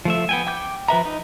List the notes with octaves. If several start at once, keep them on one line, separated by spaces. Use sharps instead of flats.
F3 A3 E5
B3 G5 G#5
G5 D6 G6
F3 B4 E5 A#5
D#4